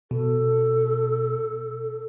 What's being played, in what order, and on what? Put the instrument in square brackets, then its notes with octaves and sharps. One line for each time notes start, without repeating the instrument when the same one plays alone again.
[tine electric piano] B2 [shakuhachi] A4